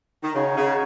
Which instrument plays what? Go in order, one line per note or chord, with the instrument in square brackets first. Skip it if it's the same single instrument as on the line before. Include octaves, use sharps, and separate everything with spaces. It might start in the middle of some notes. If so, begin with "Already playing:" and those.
[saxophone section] D#3
[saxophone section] C#3 [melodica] D#4 F#4 C#5
[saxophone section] C#3